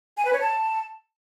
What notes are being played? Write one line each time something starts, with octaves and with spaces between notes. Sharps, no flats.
G#5
B4
C#5
A5